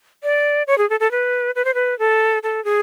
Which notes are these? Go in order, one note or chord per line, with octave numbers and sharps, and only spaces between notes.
D5
C#5
G#4
A4
A4
B4
B4
C5
B4
A4
A4
G#4